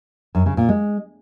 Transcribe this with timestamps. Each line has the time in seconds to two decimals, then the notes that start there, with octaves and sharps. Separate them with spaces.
0.35 F#2
0.46 C#3
0.57 A#2
0.69 G#3